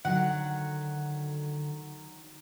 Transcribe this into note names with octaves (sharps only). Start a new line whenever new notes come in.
D3 D#3 F#3 F#4 F#5